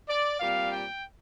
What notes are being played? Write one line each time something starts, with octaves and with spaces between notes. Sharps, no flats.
D5
A#2 G3 C4 F5
G5